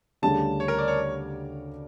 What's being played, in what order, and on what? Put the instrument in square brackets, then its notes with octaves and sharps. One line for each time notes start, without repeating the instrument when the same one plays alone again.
[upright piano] D2 C#3 G3 D4 G4 [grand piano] A5
[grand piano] C#5
A#4
D5
C#5